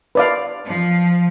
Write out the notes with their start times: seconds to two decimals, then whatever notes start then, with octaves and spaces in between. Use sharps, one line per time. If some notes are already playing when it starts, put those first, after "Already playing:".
0.15 B4 D5 F5
0.66 F3